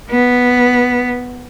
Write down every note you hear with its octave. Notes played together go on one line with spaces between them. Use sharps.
B3